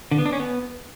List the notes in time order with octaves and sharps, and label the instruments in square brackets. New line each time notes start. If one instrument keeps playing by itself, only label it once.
[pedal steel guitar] D3
B3
D4
C#4
B3